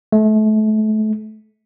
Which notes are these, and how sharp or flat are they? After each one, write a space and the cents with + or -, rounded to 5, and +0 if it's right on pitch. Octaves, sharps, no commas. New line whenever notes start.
A3 -30